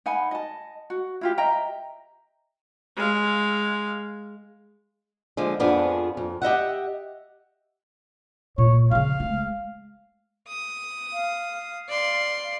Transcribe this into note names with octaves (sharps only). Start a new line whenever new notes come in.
D#4 F#5 G#5 B5
D#5 A5
F#4
E4 F4 G4
D#5 E5 G5 A#5
G#3 F5
D3 F3 G#3
F2 F3 B3 D4 G#4
F2
G4 D#5 E5 F#5
A#2 C#5
C#3 F3 F5
G#3 A3
D#6
F5
D5 C6